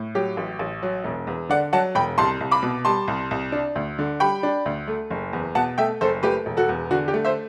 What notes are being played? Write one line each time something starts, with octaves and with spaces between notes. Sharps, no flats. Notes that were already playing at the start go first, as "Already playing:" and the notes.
Already playing: A2
F#3 G4
A1
A1
F#3
E1
E2
D3 D5 F#5
F#3 F#5 A5
E1 G5 B5
C2 A5 C6
C2
B5 D6
B2
G3 A5 C6
C2
C2
D4
D2
D3
G3 G5 B5
D4
D2
A3
F#1
E2
B2 F#5 A5
A3 E5 G5
F#1 A4 C5
A3 G4 B4
E1
F#4 A4
E2
D3 F#4
G4
A3
C5 E5